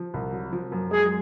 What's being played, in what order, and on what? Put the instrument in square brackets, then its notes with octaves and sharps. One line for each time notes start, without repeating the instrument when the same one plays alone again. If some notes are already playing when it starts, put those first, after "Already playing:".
Already playing: [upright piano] F3
C2
F#3
F3
F#2
[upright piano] G#3 [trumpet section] G#4